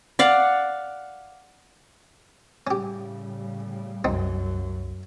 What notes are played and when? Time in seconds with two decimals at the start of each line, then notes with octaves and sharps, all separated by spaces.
0.19 D5 F5 F#5
2.67 A2 C#3 G3 C#4 G4
4.04 C2 F#2 C4 D#4